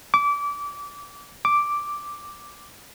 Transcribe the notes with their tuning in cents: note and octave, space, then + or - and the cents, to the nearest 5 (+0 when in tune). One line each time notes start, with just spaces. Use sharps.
D6 -25
D6 +0